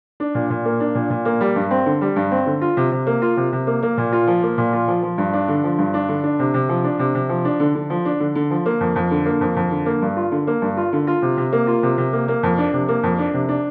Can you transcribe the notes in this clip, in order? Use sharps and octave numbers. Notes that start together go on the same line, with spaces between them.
D4
A#2
A#2
A#3
D4
A#2
A#2
A#3
G3
G2
C4
D3
G3
G2
C4
D3
F4
C3
C3
A#3
F4
C3
C3
A#3
A#3
A#2
F4
F3
A#3
A#2
F4
F3
F3
G2
D4
D3
F3
G2
D4
D3
D4
C3
C3
F3
D4
C3
C3
F3
D4
D3
D3
F3
D4
D3
D3
F3
A#3
F2
F2
D3
A#3
F2
F2
D3
A#3
G2
F4
D3
A#3
G2
F4
D3
F4
C3
C3
A#3
F4
C3
C3
A#3
A#3
F2
D4
C3
A#3
F2
D4
C3
D4